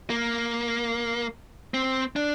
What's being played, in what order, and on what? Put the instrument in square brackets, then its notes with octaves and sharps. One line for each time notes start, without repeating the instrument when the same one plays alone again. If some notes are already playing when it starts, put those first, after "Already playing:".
[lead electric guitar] A#3
C4
D4